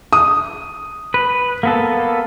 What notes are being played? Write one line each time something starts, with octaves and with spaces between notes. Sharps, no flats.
D#6
B4
A#3 B3 A4